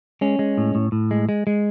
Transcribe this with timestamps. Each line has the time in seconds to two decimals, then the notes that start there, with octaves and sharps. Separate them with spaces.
0.21 G#3 C#4
0.39 G#3
0.58 A2
0.75 A2
0.92 A2
1.11 G#3
1.29 G#3
1.47 G#3